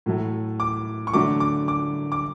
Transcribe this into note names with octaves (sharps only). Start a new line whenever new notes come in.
A2 F#3 A3
D6
C#6
D3 F#3 A3 D6
D6
D6
D6